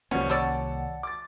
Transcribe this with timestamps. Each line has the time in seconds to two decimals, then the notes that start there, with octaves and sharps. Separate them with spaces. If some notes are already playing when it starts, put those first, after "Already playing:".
0.11 C2 B2 D#3 F3 G3 A#3 C#4 F#5
0.30 G3 C#5 D5 A5 E6 A6
1.03 D6 A6